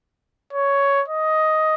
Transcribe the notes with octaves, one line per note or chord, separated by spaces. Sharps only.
C#5
D#5